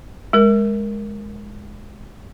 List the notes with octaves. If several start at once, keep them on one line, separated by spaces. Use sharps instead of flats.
G#3 A#4